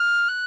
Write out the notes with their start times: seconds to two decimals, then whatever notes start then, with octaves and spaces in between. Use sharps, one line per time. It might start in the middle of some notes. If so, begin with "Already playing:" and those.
Already playing: F6
0.28 F#6